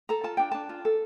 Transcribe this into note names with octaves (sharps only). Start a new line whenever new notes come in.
A4 A#5
F4 A5
D4 G5
D4 A5
F4
A4